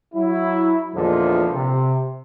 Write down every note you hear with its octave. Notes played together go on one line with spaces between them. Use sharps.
F#3 E4
E2 A#2 D3 F3 G#3
C3